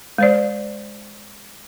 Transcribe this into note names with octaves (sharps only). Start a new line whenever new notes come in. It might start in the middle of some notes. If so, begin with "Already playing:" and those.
G#3 C5 D5